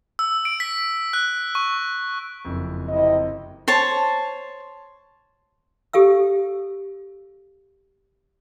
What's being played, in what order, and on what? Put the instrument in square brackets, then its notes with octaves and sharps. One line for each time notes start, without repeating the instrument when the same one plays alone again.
[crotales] E6
D7
B6
F#6
C#6
[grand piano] F#1 F2
[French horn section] C3 E4 D#5
[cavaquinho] C5 C#5 A5
[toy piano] G4 A4 F5 E6